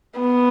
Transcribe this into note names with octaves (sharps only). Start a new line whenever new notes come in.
B3